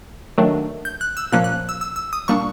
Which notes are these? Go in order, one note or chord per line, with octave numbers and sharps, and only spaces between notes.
D#3 F#3 A3 D4
G6
F#6
E6
A#2 F3 A#3 C#4 F#6
F#6
E6
E6
E6
D#6
A#2 G3 A#3 D4 C#6